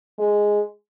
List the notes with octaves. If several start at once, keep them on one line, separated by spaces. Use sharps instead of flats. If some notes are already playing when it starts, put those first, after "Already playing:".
G#3